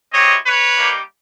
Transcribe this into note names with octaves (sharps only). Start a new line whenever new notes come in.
G#3 C4 E4 G4 C#5 D#5
B4 C#5
G3 A#3 D#4 G4